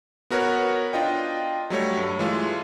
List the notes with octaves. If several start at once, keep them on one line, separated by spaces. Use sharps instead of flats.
B3 F#4 A#4 B4 C#5
D4 F4 D#5 G5
F#3 G3 A3 C#5
G2
E3 G#3 A3 F4